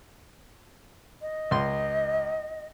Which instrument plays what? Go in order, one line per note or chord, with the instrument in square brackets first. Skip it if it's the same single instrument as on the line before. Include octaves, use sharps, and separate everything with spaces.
[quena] D#5
[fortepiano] C#2 C6